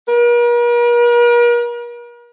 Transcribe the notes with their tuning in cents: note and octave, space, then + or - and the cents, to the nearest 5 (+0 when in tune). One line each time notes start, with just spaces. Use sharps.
A#4 +45